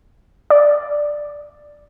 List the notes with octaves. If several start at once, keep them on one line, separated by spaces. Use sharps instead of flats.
D5